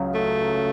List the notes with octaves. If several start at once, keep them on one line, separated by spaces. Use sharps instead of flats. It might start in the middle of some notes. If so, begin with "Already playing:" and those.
Already playing: C#2 C#3 F#3
A3